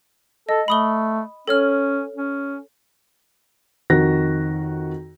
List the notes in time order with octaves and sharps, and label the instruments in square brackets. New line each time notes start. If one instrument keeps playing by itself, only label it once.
[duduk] A4 [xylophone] D#5
[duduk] A3 [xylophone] B5 D#6 G7
[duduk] C#4 [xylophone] A4 C#5 F6
[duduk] C#4
[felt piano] F2 D#3 F#4 A#6